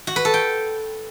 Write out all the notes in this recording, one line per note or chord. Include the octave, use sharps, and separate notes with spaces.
F#4
B4
A4
G5